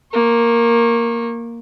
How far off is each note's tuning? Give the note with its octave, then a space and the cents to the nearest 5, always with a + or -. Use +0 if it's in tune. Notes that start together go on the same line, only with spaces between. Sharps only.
A#3 +0 C#6 -35